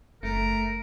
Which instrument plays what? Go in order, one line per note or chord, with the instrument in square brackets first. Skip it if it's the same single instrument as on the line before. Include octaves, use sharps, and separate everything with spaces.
[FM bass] F#1 [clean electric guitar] A3 [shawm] A#4